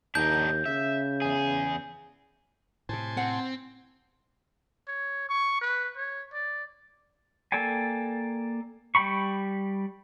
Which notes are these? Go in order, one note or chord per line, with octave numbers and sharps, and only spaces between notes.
D#2 D4 D#4 A#4 G6
C#3 E5
E2 G#4
A2 C3 C5 G#5 A5
C4 F#5
C#5
C#6
B4
C#5
D5
A#3 A4 D5 G5 G#5
G3 G5 B5 C#6